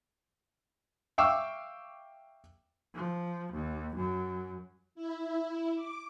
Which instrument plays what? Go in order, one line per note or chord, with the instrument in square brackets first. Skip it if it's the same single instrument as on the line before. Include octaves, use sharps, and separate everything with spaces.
[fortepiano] E5 F5 G5 C#6 D6 E6
[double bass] F3
D#2
F#2
[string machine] E4
D6